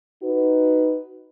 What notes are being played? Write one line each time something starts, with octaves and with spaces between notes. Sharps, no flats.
D#4 F#4 B4